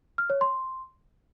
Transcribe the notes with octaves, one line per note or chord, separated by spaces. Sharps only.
F6
C#5
C6